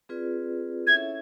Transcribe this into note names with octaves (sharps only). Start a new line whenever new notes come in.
C4 F4 G#4 B4 D5
C#4 E4 A4 C#5 E5 G#6